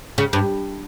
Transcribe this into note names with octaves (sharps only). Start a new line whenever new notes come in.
C#3
G2